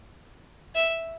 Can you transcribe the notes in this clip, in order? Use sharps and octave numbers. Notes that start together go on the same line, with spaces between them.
E5